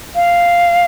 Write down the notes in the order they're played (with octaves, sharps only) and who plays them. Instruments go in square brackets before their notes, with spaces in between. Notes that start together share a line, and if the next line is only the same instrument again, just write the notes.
[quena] F5